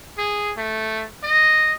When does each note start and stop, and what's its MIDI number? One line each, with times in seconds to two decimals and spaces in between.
0.18 0.52 68
0.57 1.04 57
1.24 1.75 75